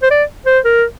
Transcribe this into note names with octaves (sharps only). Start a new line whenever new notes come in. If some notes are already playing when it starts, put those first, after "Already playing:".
C5
D5
C5
A#4